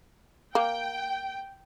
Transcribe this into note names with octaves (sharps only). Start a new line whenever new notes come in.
A#3 G5